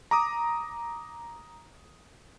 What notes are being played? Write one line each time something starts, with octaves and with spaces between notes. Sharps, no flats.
A#5 D6 D#6